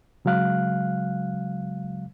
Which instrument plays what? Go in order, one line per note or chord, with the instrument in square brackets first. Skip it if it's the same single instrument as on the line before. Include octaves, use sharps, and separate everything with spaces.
[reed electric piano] C#3 F#3 G#3 F5 F#6